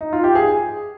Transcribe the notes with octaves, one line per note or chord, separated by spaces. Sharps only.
D#4
F4
G4
G#4